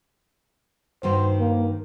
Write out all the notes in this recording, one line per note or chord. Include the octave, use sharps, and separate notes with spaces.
G2 D#3 F#4 C5
A#3